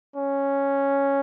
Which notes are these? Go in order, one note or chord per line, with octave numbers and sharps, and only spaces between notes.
C#4